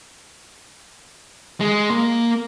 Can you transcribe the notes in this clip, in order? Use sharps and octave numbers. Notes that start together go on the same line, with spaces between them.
G#3
A#3